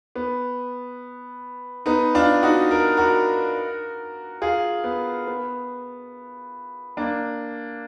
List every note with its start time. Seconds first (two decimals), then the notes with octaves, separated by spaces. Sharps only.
0.16 B3
1.86 B3 D#4
2.15 D4 F4
2.43 D#4 F#4
2.71 A#4
2.97 F#4 A#4
4.42 F4 G#4
4.84 B3
5.27 B3
6.97 A#3 D4